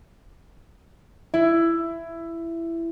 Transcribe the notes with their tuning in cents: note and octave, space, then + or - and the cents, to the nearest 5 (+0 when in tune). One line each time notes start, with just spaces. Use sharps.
E4 +15 E5 +10